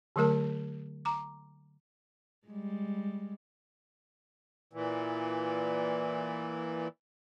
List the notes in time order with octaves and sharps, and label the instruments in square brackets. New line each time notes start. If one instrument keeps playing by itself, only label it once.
[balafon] D3 F#3 A3 A#4 A5
A#5 D6
[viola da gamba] G3 G#3
[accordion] A#2 E3